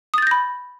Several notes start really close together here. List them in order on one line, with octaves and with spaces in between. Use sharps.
D#6 A6 G6 A#6 B5